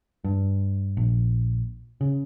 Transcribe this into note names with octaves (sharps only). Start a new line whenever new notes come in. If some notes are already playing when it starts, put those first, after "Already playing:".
G2
A#1
C#3